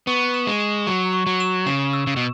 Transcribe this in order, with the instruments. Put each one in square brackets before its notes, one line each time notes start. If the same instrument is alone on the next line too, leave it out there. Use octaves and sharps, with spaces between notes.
[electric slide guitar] B3 [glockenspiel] C#6
[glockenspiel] E7
[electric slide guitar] G#3
[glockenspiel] E7
[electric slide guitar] F#3 [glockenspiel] C#6
[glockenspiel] C#6
[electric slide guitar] F#3
[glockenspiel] E7
[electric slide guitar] C#3 [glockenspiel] E7
[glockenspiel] E6
[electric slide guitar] C#3
B2